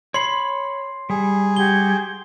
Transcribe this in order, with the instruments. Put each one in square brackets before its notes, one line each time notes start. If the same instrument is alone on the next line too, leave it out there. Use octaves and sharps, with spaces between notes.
[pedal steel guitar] C#5 B5 [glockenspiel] C6 C7
[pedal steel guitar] G3 [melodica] G#4
[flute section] F#4 G4 G#6 [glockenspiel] G7